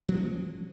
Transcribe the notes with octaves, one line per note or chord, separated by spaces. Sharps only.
F3 A#3 C4 C#4